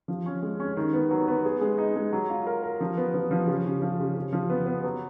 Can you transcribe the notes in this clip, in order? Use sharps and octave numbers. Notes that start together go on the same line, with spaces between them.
F3
C#4
G#3
C#4
D#3
B3
F#3
B3
G#4
G#3
D#4
G#3
F#3
F4
A#4
A#4
F3
B3
F3
F3
C#3
C#3
F3
C#3
C#3
F3
B3
B3
F#3